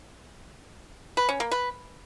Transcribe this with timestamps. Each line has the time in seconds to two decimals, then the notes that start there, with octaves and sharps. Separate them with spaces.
1.17 B4
1.29 C#4
1.40 A#3
1.51 B4